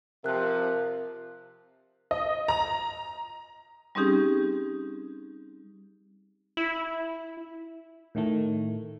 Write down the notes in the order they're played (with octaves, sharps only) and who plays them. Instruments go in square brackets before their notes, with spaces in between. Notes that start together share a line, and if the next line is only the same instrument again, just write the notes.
[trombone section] C3 F3 [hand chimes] A#4 F#6
[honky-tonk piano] D#5
A#5
[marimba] G3 C4 C#4 D#4 G4 G#4
[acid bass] E4
[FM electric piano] A2 D#3 A3